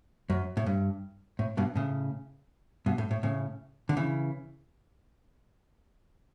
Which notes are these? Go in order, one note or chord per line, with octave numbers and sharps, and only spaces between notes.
F#2
A2
G2
A2
G2 B2
A2 C#3
G2 B2
A2
A2
A2 C#3
D3
C#3 E3